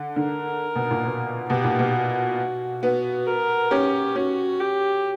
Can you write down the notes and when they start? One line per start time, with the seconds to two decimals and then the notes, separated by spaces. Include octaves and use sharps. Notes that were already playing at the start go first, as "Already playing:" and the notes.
Already playing: D3
0.16 D3 A#4
0.75 B2
0.91 A#2
1.05 B2
1.49 B2 G4
1.64 A#2
1.79 B2
1.94 F#4
2.82 B3 F#4
3.26 A#4
3.71 C#4 G4
4.15 C#4 F#4
4.60 G4